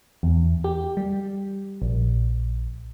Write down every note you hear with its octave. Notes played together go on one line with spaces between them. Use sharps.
E2
G4
G3
A#1